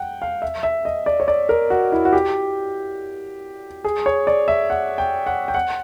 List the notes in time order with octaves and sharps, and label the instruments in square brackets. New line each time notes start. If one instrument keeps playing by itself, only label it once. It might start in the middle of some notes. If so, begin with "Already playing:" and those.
Already playing: [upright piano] F#5 G5
F5
E5
E5
D#5
D5
C#5
D5
A#4
F#4
E4
F#4
G4
G#4
C#5
D5
E5
F#5
G5
F#5
G5
F#5